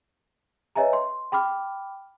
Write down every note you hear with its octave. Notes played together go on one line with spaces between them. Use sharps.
B4 C#5 D#5 E5 G#5 A#5
C6
G5 B5 D6 F6